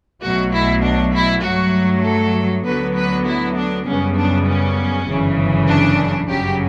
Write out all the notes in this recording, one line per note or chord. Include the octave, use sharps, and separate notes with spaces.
B1 B2 F#3 A3 F#4
E4
D4
E4
G2 F#3 A3 F#4
A4
D2 D3 F#3 B3 B4
B4
E4
D4
F#2 C#3 G3 B3 C#4
D4
C#4
G1 F#2 C#3 E3
D4
G1 F#2 C#3 F#3 G4